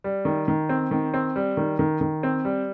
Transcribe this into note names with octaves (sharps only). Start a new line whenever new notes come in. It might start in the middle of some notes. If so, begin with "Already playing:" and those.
G3
D#3
D#3
C4
D#3
C4
G3
D#3
D#3
D#3
C4
G3